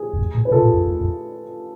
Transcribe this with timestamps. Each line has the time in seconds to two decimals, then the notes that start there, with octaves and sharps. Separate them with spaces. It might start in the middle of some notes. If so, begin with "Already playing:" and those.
Already playing: G#4
0.13 E2
0.19 F2
0.35 A2
0.45 B4
0.51 C3 F4 A4
0.62 A2
0.74 F2
0.85 E2
1.01 F2